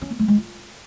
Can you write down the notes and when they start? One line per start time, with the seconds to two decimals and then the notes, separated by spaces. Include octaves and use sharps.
0.01 C#4
0.10 A#3
0.19 A3
0.28 G#3
0.37 F4